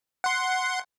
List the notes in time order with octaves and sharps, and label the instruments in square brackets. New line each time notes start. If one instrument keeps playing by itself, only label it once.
[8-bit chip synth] F#5 C6